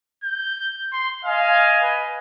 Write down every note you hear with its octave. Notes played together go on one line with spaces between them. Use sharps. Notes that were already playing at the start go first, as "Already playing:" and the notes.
G6
C6
D#5 F5 G#5
B4